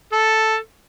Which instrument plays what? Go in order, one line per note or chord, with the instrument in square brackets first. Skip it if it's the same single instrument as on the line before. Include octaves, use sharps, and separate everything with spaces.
[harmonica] A4